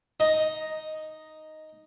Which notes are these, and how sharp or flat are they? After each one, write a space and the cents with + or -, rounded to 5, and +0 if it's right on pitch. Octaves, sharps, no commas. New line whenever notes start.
D#4 +0 D#5 +5